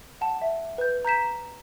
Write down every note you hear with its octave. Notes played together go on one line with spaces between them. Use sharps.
F#5 A5
E5
B4 G6
A#5 G6 B6 E7